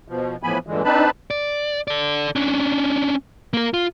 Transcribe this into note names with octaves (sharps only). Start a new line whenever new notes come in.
B2 F3
A2 E3 F3 B3 G#5 B5
G2 A#2 D3 E3 G#3
C4 D4 D#4 B4 A5 B5
D5
A4 D5
C#4 D4
A#3 A#4
F4